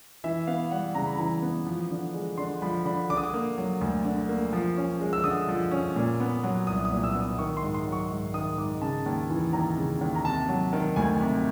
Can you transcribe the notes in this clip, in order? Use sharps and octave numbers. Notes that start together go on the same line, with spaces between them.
E3 E5
B3 F5
G3 F#5
C#3 A#5
B5
E3 A#5
B3
F3
D3
G#3
D3 C6
F3 B5
D3 B5
D3 D6
D#6
D6
A#3
F#3
D2
D3
A#3
F3
C#4
G#3
E6
D3 D#6
F3
C#4
A#2
B3
F#3
C2 D#6
D#6
A#2
E6
B3
D#6
D#3 C#6
C6
G#2
C6
F#3
C#6
G#2
D#3 D#6
G#2 D6
C#3 A5
D#2
E3
D#2 A#5
C#3
D#2
A#5
C3 A5
F#3
D#3
D2 G#5
C3